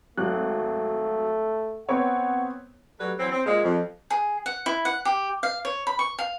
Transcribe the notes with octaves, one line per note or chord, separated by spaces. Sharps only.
G#1 F#3 A3 F#6
B3 C4 C#5 F#5
F#3 G3 A3 B4
E3 F#3 C4
C4
A#2 G#3
F2
G#4
F#5
E4
F#5
G4
F5
C#5
B5
C#6
F5